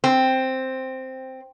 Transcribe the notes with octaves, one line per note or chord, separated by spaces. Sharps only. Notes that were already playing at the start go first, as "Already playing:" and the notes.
C4